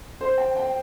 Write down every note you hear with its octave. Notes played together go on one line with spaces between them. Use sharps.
C5
G5
G5